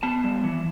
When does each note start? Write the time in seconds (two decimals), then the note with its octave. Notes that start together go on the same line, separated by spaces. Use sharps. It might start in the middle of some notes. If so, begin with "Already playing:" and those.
0.03 B3 A5
0.24 G3
0.44 E3